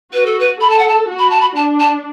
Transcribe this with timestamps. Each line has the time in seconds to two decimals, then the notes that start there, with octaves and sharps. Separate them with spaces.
0.13 F#4 B4
0.26 A4
0.39 B4
0.61 A4 B5
0.70 A5
0.79 F#5
0.88 A5
1.09 F#4
1.19 B5
1.30 A5
1.41 B5
1.56 D4 A5
1.79 A5